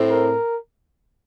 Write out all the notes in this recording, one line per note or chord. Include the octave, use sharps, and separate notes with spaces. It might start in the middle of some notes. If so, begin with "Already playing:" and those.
Already playing: A2 A3 C4
A#4